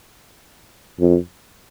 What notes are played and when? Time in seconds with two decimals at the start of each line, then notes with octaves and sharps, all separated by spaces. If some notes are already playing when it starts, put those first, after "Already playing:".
1.00 F2